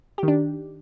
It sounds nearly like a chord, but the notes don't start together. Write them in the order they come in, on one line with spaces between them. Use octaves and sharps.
G4 D#3 D4